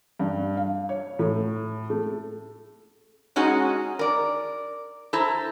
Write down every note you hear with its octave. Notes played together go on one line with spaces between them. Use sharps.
G2
F5
C#5
A2
A3
G#3 C#4 D#4 F#4 G#4
A#4 D5
E4 A4 C5 A#5